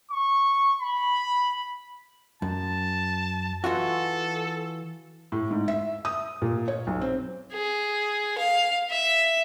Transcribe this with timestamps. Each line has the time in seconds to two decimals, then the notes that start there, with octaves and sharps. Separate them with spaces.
0.11 C#6
0.80 B5
2.42 F#2 A5
3.64 E3 F4 F#4 A4
5.32 A2
5.50 G#2
5.68 E5
6.05 D#6
6.42 A#2
6.68 C#5
6.87 B1
7.01 C4
7.52 G#4
8.38 F5
8.90 E5